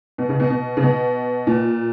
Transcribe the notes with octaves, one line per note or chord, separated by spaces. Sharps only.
B2
C#3
B2
B2
C#3
B2
A#2